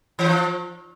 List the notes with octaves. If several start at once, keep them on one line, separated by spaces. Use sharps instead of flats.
E3
F3